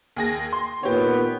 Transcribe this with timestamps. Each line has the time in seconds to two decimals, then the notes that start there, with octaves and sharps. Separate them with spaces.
0.16 D#2 G#4 A#6
0.53 C6
0.83 A#2 D#3 B3 G4 C#5